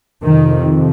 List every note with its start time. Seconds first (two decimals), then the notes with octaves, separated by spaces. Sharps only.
0.23 F2 C3 D#3